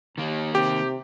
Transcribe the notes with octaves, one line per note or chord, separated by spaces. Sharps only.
D#2 D#3 A#3
C3 G4